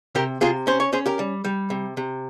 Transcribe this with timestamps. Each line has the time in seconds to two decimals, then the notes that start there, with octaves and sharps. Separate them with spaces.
0.15 C3 G4 A#4
0.41 C3 F4 G#4
0.67 C#4 C5
0.80 C#5
0.93 C#4 G#4 C5
1.06 G4 A#4
1.19 G3
1.44 G3
1.70 C3
1.97 C3